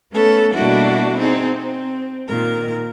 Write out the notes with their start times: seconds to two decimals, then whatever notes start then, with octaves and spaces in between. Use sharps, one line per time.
0.12 A3 B3 C#4 A4 B4
0.52 B2 G3 A#3 D4 E4 F#4
1.18 C4 D#4 G#4
1.60 C4
2.28 A#2 D#3 A#4